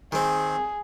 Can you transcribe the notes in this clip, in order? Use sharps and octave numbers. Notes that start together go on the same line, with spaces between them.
D#3 C4 G#4